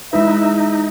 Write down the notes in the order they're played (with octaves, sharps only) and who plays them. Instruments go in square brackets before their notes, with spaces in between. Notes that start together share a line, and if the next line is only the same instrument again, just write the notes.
[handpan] G#3 E4 B4 [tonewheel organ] D#4 [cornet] E5